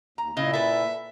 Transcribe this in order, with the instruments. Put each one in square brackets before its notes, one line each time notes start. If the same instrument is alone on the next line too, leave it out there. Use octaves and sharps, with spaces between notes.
[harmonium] D#2 [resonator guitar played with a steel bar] A#5
[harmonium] A#2 E4 [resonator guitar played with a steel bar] C#3 [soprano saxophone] D#5
[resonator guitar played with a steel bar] A4 B4 [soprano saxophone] E5